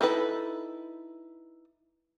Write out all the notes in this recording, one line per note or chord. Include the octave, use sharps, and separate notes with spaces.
D#4 E4 A4 B4